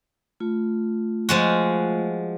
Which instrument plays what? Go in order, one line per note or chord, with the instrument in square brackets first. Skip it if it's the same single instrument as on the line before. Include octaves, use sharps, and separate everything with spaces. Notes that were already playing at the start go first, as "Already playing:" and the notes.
[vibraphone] A3 F4
[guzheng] F3 G#3 F#4